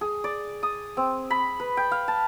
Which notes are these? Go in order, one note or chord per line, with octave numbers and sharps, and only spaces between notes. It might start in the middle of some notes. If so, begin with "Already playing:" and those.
G#4
D5
D#6
C4
B5
B4
G5
F5
A5